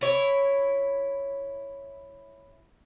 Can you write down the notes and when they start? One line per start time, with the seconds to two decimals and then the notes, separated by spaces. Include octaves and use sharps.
0.01 E4 C#5